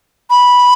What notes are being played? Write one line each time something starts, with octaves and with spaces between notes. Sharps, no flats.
B5